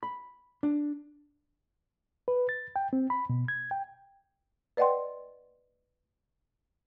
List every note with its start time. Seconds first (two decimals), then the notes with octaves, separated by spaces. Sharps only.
0.03 B5
0.63 D4
2.28 B4
2.49 A6
2.76 G5
2.93 C4
3.10 B5
3.30 B2
3.48 G#6
3.71 G5
4.77 B4 D5 D#5 F#5 G5 C6